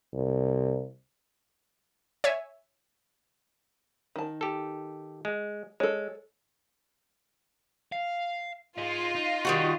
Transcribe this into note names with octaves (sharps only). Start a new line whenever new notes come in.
C2
C#5 E5 G#5
D#3 A5
G4 A4
G#3
G#3 A4 C#5
F5
D#4 F4 G#4
D#4
D#3 G3 F#4